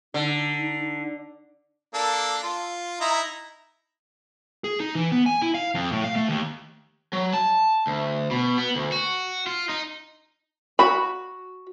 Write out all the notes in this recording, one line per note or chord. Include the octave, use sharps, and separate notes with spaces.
D3 D#4
A#3 D4 A4
F4
D#4 E4 A#5
G#4
D#4
E3
B3
G#5
E4
F5
F2
A2
F5
A3
D#2
F#3
A5
D2
B2
B3
D2
F#4
F4
D#4
F#4 B5